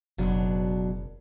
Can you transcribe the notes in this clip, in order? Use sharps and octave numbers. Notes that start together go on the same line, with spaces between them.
F#1 B2 F#3 D4